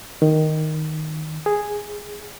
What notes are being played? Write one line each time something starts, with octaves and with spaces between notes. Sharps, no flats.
D#3
G#4